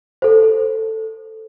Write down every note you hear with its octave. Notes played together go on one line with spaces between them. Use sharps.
A4 C5